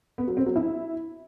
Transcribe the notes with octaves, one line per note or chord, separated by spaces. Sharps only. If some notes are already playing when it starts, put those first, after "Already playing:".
B3
F#3
C4
F#3
E4